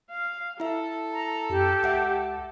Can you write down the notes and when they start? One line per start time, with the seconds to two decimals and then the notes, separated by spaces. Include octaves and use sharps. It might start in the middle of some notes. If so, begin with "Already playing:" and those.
0.10 F5
0.60 E4 A4 E5
1.13 A#5
1.50 F#2 G4
1.83 C#2 E5 F#5 D6